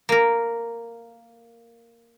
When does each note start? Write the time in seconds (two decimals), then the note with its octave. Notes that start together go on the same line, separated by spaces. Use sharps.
0.09 A#3 A#4